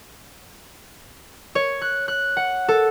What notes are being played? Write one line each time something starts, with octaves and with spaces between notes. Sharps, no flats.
C#5
F#6
F#6
F#5
A4